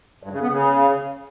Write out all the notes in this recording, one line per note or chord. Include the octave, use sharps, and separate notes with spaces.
G2
C#3
B3
C#3